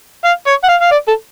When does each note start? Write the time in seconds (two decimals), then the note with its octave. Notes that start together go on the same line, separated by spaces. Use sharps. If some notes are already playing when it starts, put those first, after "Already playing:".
0.24 F5
0.46 C#5
0.64 F#5
0.68 F5
0.81 F5
0.91 D5
1.08 A4